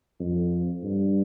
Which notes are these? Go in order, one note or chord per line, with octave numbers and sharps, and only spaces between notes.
F2
G2